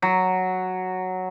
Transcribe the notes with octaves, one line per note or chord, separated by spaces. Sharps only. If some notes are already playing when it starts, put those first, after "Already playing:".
F#3